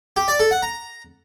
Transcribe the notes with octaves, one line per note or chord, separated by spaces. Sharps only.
G4
D5
A4
F#5
A#5